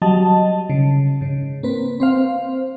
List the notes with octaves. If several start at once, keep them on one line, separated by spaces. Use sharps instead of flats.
F#3 G3 D#5 A5
C#3
G#2 C#3
A#3 C4 B4
C4 C5 F5